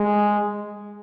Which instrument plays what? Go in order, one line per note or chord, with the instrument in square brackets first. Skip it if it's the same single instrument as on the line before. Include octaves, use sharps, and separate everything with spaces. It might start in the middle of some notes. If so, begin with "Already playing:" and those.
Already playing: [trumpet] G#3